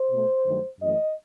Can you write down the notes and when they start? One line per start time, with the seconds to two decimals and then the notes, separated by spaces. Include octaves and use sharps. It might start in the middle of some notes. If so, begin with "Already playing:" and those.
Already playing: C5
0.11 B2 A3
0.46 G2 D#3 F#3 A3
0.80 F#2 E3 A3 D#5